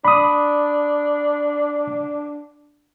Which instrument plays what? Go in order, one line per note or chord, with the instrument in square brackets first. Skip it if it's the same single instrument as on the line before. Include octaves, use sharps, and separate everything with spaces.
[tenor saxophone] D4 [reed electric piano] B5 D#6